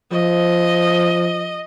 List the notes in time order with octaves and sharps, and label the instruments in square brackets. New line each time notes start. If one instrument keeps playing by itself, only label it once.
[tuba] F3 [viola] D#5